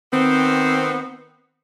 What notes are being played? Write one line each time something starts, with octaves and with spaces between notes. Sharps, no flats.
D#3 B3 C4